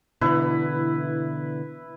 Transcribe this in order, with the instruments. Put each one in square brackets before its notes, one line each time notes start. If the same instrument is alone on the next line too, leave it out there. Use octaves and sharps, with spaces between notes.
[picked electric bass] B2 D3 E3 [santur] E4 B4